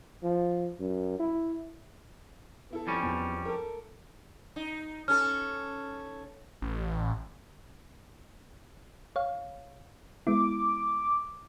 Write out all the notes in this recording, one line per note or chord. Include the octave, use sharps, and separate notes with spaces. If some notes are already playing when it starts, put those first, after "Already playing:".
F3
F#2
E4
B3 E4 A4
F2 G3 C#4
E2
A4 A#4
D#4
C#4 A4 F6
A1
C#5 F5
G#3 B3 E4 D6